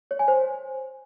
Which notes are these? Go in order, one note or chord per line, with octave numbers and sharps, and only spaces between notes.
C#5
G#5
C5